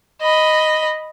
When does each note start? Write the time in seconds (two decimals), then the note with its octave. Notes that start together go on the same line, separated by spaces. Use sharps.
0.21 D#5 B5